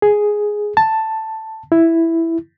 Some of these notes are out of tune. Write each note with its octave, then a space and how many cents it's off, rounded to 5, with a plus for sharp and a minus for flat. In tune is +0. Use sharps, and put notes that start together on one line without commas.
G#4 +5
A5 +5
E4 +0